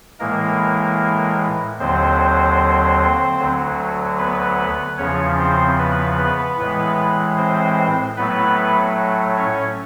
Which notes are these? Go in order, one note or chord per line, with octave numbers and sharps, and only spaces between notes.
A2 E3 G#3 A#3 A#4
D#2 D3 F#3 C4 C5
D2 D3 F#3
B3 B4
E2 C#3 F3 C#4 C#5
C4 C5
B3 B4
B3 B4
A2 E3 G#3
C4 C5
A2 F#3 A3 B3 B4
C#4 C#5